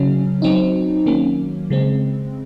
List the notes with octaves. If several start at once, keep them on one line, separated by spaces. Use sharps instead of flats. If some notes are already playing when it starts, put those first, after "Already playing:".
Already playing: C#3 F#3 C#4
F#3 C4 D#4
D#3 F#3 A#3 C#4
C#3 G#3 C4